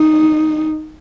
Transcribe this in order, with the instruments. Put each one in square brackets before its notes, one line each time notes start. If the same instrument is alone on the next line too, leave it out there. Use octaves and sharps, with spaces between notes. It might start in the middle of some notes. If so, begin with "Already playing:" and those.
Already playing: [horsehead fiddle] D#4